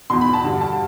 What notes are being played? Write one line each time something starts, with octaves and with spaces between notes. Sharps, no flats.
E2 B2 C6
B5
A5
G2 D3
A5